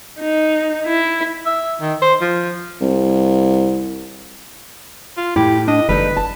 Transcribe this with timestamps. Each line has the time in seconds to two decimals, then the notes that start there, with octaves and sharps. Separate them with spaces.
0.19 D#4
0.87 E4
1.46 E5
1.81 D#3
2.02 C5
2.21 F3
2.81 C2
5.17 F4
5.36 A2 E4 G4
5.68 D4 D#5
5.89 G1 G3 A3 D#4 B4
6.17 A5